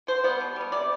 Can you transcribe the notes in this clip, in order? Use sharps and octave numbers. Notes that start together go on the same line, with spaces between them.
B2 C5
G3 B3
B2
G3 B3
C3 D5